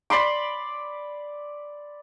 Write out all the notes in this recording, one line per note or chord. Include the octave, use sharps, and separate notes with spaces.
D5 B5 C6 D6